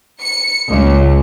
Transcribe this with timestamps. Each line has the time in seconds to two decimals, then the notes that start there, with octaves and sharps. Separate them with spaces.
0.21 C#7
0.70 C#2